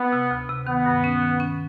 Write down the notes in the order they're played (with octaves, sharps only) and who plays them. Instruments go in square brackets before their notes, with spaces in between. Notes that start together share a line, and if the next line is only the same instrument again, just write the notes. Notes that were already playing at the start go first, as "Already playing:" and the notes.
Already playing: [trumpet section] B3
[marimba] C3
D2
C3
[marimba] D#3 [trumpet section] B3
[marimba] G2
C#4
D#3
C#4